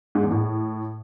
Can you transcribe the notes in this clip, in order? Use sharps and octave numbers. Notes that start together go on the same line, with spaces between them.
G#2
E2
A2